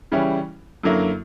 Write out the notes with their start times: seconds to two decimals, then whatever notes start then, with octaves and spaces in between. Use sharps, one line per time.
0.12 C#3 E3 G3 C#4 E4
0.83 F#2 D3 F#3 A#3 E4